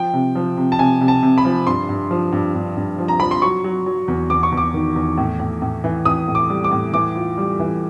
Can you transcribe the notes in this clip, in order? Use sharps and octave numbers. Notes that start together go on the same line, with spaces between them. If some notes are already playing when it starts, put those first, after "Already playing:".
Already playing: F3 G5
C3
F3
C3
A5
C3 G#5
C3
A5
C3
B5
F3
G2 C6
G2
F3
G2
G2
G2
F3
A#5
F3 B5
C6
F#3 C#6
F#3
F#3
E2
E2 D6
C#6
E2
D6
D#3
E2
A2
A2
A2
E3
E3 D#6
A2
D6
G3
D6
A2
E3 D6
F4
G3
E3